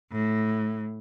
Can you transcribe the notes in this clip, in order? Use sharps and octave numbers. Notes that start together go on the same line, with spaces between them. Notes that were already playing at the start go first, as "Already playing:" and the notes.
A2